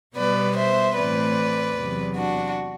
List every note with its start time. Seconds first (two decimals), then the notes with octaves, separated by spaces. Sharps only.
0.16 B2 G3 B3 B4 D5
0.56 C5 E5
0.95 A2 E3 A3 C4 B4 D5
1.75 E2 C3 F#3
2.15 D4 F#4